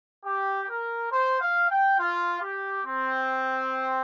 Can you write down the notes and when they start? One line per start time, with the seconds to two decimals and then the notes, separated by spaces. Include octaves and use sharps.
0.25 G4
0.69 A#4
1.11 C5
1.40 F5
1.70 G5
1.98 F4
2.42 G4
2.85 C4